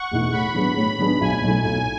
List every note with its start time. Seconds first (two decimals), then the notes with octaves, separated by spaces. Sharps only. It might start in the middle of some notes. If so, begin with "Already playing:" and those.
Already playing: F#5 C#6
0.11 E2 B2 A3 E4
0.32 A2 B5
0.55 F#3 B3 D4 G#4
0.76 A2 B5
0.99 F#3 B3 D4 G#4
1.21 B1 G#5
1.43 B2 F#3 A3 E4
1.64 B1 G#5